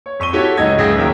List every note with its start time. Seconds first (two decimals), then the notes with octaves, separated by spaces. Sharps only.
0.06 C#5
0.20 F2 C#6 D#7 G7
0.33 E4 F#4 G4 A4 C#5
0.57 C#2 F#3 D#4 D#5 G#6
0.78 F#1 C#2 G#4 E5 G5 A#6
0.96 G#1 D#2 F#3 A#4 E5 G5